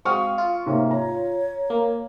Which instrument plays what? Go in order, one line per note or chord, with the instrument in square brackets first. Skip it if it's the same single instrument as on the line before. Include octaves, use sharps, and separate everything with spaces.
[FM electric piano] G#3 C4 F#4 [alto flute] F5 [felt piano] C#6 D#6 F6
[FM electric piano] F4
[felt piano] G#2 C3 A#3 [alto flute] C#5
[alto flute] C#5 [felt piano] A#5
[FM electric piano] A#3